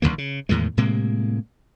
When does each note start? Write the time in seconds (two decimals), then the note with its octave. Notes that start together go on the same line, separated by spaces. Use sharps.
0.02 A#1 D#2 D#3 A#3
0.18 C#3
0.49 E2 A2 D#3 G#3
0.77 A2 C3 G#3 A#3